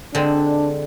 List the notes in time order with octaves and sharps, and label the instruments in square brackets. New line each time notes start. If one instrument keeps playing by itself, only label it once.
[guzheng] D3 G#3 C4 [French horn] D4